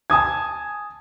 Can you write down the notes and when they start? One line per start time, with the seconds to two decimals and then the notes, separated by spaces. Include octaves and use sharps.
0.10 G#5 A5 D#6 G#6